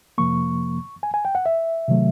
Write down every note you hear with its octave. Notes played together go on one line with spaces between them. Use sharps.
F2 C3 F3 A#3 C#6
G#5
G#5
G5
F#5
E5
C3 D#3 F#3 A3